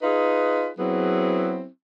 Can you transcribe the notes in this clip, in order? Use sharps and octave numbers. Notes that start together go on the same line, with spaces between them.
D#4 F4 G#4 B4
F#3 B3 C4 E4 G#4